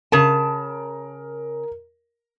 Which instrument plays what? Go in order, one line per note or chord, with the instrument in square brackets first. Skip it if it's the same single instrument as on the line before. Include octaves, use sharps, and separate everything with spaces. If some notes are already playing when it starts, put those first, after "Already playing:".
[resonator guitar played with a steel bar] C#3 A5 [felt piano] A#4